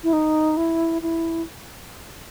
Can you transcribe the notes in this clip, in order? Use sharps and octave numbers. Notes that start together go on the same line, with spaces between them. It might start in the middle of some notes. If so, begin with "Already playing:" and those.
E4
D#4
E4
E4